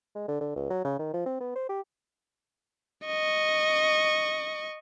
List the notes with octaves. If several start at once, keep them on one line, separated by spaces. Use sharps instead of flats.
G#3
D3
D3
C#2
F#3
C#3
D#3
F3
C4
B3
C5
G4
D#5 C#6